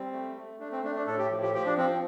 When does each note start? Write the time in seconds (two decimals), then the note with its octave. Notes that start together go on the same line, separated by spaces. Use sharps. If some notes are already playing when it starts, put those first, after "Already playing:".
Already playing: G3 C4
0.13 A3
0.37 A3
0.60 A3 D4
0.72 C4
0.83 A3 D4
0.95 D4
1.07 A2 A4
1.18 G4
1.31 F3
1.42 G4
1.54 F3 G4
1.66 D4
1.77 F3 C4
1.89 C4